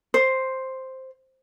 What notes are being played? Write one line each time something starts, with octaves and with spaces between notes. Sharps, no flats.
C5